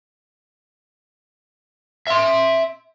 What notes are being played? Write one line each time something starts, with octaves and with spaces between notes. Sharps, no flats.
E5 C6